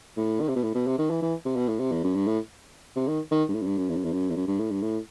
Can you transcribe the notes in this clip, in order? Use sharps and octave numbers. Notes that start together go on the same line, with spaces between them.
A2
D#3
C3
B2
A2
B2
C3
D#3
E3
E3
C3
B2
A2
C3
E2
F#2
G2
A2
C3
D#3
D#3
G2
A2
F#2
G2
F#2
E2
F#2
E2
F#2
E2
F#2
G2
A2
G2
A2